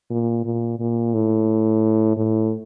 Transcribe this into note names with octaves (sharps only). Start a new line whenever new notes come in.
A#2
A#2
A#2
A2
A2